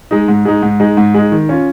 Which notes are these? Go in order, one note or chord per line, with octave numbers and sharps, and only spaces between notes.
G#3 D#4
G#2
G#3 D#4
G#2
G#3 D#4
G#2
G#3 D#4
D#3
C#4 F4